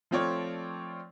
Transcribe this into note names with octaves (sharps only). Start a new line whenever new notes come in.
F3 A3 C4 F4 C#5 D5